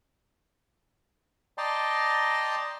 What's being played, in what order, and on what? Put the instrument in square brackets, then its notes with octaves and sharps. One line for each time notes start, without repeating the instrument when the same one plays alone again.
[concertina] D5 D#5 G5 A5 A#5 C6